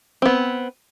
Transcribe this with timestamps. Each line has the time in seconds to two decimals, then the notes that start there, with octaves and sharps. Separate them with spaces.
0.22 B3 C4